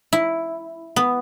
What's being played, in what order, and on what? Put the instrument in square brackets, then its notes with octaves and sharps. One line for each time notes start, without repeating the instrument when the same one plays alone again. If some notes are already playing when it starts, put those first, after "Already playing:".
[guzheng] E4
B3